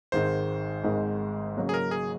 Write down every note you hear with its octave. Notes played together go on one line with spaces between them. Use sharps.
G#1 G#2 D#3 G#3 C5
G#1 G#2 D#3 G#3
C#3 F#3 A#3
G#4
A#4
G#4